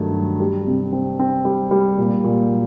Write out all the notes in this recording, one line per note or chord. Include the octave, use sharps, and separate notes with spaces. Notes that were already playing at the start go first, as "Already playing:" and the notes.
Already playing: G2 D#3 F#3 A3
F#3
G3
C3
C4
C4
G3
G3
A#2
A#2
F#3